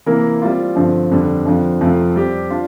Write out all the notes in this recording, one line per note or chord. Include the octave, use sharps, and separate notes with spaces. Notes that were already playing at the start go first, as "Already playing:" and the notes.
C3 E3 A#3 E4 A#4
G3 C4 F4
G2 D3 F3 C4
F2 D3 G3
F2 D3 F3
F2 C3 F3 A3 C4
G3 C4 G4
D4 F4